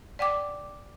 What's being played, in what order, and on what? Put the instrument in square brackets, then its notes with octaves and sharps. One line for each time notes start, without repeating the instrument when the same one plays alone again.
[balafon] D5 F#5 G5 D6